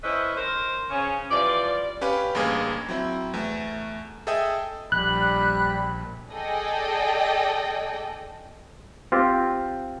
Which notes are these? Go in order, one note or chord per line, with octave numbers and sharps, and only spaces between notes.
C#4 E4 A4 B4 C5 D#5
A#4 C5
C#3 C#4
E3 F3 G3 D5
C#4 G4 B4 F5 B5
A1 G2 A#3 G#4 F5 G#6
F#3 C4 E4
E2 A3
G#4 A4 D#5 E5 G5 D#6
A#1 G3 B5 F#6
G#4 A4 D5 D#5 G5
C4 F4 G4